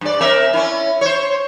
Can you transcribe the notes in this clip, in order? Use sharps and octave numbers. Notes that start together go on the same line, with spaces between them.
G2 D5
C4 A#4 E5
C#4 E4
C5 C#5